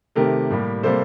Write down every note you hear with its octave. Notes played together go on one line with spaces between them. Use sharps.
C3 D#3 A3 G4 A#4
A2 G3 A#3
C3 G3 A#3 A4 C5